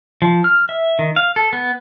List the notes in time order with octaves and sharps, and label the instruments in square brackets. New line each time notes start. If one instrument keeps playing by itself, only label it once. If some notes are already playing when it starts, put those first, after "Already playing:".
[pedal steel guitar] F3
F6
E5
D#3
F5
A4
B3